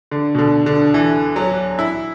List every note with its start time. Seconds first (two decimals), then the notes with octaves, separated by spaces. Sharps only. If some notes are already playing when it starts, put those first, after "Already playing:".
0.11 D3
0.35 B2
0.38 D3
0.66 D3
0.94 E3
1.36 F#3
1.79 E4